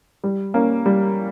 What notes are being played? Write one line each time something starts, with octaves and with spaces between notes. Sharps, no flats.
G3
A#3 C#4
G3